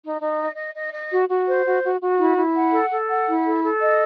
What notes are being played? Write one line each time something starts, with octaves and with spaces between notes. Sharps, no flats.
D#4
D#4
D#5
D#5
D#5
D#5
F#4
F#4
C5
F#4
F#4
F#4
E4
E4
F#5
A4
A4
F#5
E4
A4
A4
D#5